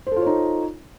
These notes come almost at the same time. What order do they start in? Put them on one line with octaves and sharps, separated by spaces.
C5 A4 F4 C#5 D#4